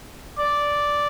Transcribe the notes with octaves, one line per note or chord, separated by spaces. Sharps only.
D5